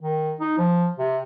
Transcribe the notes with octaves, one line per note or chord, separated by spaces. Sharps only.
D#3
D#4
F3
C3